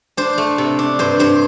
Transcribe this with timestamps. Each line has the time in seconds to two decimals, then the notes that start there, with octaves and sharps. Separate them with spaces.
0.17 D4 C5
0.38 A3
0.58 C3
0.79 D4
0.99 G2 C5
1.19 G2 C5